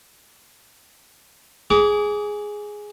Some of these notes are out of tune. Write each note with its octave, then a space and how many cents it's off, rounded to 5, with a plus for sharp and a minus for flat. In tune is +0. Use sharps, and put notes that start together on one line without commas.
G#4 +0 D6 -30